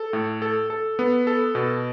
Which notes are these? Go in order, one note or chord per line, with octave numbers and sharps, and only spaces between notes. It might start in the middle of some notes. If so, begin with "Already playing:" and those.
Already playing: A4
A2
A4
A4
B3
A4
B2